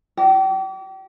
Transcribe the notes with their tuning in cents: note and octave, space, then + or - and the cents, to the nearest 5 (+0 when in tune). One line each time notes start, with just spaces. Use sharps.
G4 -35